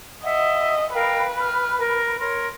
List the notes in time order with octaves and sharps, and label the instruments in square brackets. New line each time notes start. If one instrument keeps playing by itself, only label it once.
[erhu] D#5 [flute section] E5 F#5
[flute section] A#4 F5 G5 [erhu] B4
[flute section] F6
A#4
A#4 C#5 C6